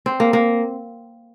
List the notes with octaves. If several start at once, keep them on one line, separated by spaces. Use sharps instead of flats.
C4
A#3
A#3